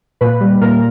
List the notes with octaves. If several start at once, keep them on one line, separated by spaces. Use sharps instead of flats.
A#2 B4
G3
A#2 A#4